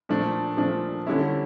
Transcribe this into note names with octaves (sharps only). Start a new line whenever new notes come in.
A#2 F3 A3 D4
A#2 F3 A3 D4
D3 G3 C#4 E4